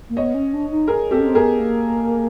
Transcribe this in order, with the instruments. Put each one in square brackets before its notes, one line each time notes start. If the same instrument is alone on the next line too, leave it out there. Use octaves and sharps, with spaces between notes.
[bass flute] A#3
[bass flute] B3 [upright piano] C#5 D#5
[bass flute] C#4
D4
D#4
[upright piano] G#4 A#4
[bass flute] C4 [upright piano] G4 A4
[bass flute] C#4
C4
[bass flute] B3 [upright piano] G#4 A#4
[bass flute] A#3